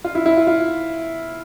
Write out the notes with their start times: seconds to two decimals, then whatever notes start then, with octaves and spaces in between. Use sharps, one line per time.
0.04 F4
0.15 E4
0.26 E4
0.37 F4
0.47 F4